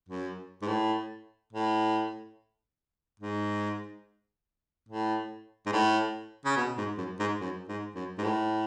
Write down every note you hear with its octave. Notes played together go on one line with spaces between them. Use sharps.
F#2
G#2
A2
A2
G#2
A2
G#2
A2
C#3
B2
G#2
F#2
G#2
F#2
G#2
F#2
G#2
A2